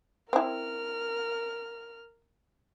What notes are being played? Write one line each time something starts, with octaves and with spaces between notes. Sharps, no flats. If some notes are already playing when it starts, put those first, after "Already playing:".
C4 E4 A#4 F6